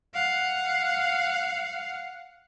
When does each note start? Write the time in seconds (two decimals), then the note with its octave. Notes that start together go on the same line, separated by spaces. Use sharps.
0.14 F5 F#5